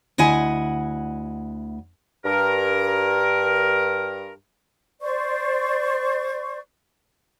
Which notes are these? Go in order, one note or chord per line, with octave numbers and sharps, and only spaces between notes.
D2 E4 D#5 F#5 G#5
G2 A#4
C5 D5 C#6